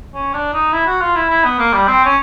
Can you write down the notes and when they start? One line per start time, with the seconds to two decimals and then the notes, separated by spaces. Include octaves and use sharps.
0.14 C#4
0.33 D4
0.53 D#4
0.72 E4
0.86 F#4
1.01 F4
1.16 E4
1.30 E4
1.44 B3
1.59 A#3
1.73 G3
1.87 C4
2.05 C#4